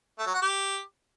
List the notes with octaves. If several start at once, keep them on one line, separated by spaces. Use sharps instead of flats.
A3
F#3
F#4
G4